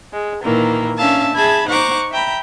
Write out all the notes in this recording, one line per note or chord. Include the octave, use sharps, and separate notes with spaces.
G#3
A#2 D#3 E3 A#3
C#4 D4 E5 F5 A5
G#4 E5 A5 B5 G#6
D#4 C5 F#5 A#5 C#6 D6
E5 G5 A#5 B5